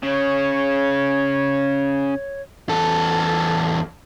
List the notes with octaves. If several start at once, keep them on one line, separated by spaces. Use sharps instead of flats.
C#3 C#5
E2 A4